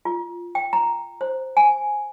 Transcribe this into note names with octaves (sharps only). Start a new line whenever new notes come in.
F4
G5
A#5
C5
G#5